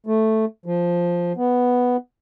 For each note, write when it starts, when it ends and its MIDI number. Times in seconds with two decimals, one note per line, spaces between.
0.06 0.45 57
0.66 1.32 53
1.37 1.97 59